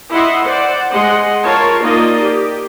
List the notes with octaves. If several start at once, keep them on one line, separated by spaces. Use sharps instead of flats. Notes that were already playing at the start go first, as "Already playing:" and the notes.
E4 D#5 E5 F#5 C6
C5 D5 F#5
G#3 D#5 F#5 C6
F4 A#4 C#5 A5
A#3 D#4 F4 D5 D#5
G4